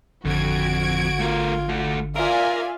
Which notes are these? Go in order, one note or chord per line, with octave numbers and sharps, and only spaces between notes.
G#1 F2 D3 F#4 G#6 D7
A3 F4 A#4
A3 F#4
F4 A#4 D5 E5 F5 G#5